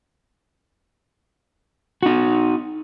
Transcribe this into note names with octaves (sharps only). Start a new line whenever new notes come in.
D#4 F#4